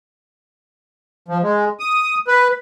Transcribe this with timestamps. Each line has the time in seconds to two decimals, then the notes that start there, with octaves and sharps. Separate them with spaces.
1.28 F3
1.42 G#3
1.80 D#6
2.28 B4